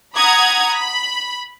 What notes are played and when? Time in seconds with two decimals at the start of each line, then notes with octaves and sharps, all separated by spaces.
0.16 F#5 A#5 B5 D#6 G#6
0.72 B5